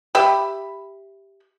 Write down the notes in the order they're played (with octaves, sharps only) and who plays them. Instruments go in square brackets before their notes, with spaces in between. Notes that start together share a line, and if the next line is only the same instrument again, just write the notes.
[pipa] G4 E5 B5